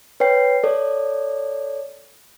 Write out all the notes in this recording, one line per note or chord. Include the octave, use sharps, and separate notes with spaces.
B4 C#5 G5 C7
A4 C#5 D5